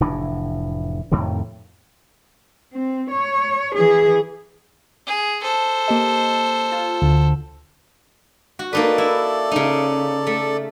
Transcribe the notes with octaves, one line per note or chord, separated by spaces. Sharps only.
F1 A2 E3 D4
F2 A2 C3 D#3
C4
C#5
E3 G#4
G#4
A4 C5
A#3 G4 D#5
F4
D2 D3
F#4
A#3 D#4 A4 B4 D5
E4
C#3 D#4
A3